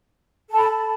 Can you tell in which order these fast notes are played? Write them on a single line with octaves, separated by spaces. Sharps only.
A4 A5 B5